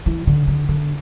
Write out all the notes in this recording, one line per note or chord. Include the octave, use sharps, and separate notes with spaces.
E3
D3
D3
D3